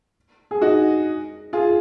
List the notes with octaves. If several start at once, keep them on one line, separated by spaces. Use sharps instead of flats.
G#4
D#4 F#4
F4 G#4